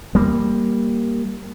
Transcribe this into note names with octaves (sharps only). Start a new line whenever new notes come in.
G3 A#3